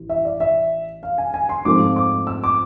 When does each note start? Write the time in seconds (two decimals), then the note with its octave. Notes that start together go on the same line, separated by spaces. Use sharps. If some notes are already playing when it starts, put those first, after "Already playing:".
Already playing: A1 E3
0.09 E5
0.25 D5
0.40 E5
1.03 F5
1.18 G#5
1.34 G#5
1.49 C6
1.65 G#2 F3 A3 C4 F4 D6
1.96 D6
2.27 E6
2.44 D6